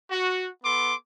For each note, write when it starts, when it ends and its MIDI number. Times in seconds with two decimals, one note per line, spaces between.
0.11 0.48 66
0.64 0.95 59
0.64 0.95 69
0.64 0.95 84
0.64 0.95 86